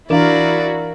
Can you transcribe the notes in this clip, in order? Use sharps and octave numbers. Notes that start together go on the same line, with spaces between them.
E3 D4 E4 F#4 A#4 D5 F5